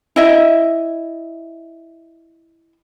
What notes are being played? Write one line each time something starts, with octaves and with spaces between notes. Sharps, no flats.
E4 D#5 E5